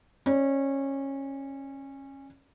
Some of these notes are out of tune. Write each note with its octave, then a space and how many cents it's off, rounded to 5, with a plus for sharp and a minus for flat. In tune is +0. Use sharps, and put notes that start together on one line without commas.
C#4 -20 D5 +0